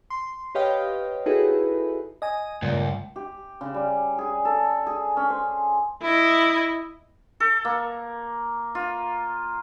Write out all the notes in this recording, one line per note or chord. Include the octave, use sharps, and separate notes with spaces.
C6
G4 B4 C#5 D#5 F5 G5
D#4 E4 F#4 G#4 A4 B4
D#5 G#5 D#6
C#2 G2 A#2
G4
C#3
G3
G#4
A4
G#4
C#4
C5
E4 D#5
A4
A#3
F4